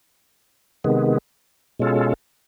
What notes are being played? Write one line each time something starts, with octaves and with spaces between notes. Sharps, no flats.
C3 D#3 G#3 B3
B2 G#3 C#4 F4 A4